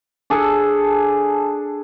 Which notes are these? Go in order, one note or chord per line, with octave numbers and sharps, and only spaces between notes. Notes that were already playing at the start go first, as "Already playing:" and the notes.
D4 G#4 A4